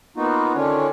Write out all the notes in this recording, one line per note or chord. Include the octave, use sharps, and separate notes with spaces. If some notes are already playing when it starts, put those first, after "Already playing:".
A#3 B3 D#4 F4 F#4
D3 D#3 C#4 D4 F4 C#5